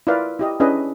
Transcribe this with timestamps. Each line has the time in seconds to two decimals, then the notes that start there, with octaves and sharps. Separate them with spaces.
0.07 E4 F4 A#4 B4 D5 F5
0.39 E4 G4 D#5
0.60 C#4 D4 E4 G#4 B4 D#5